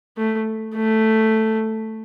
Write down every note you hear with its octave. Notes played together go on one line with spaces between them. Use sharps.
A3
A3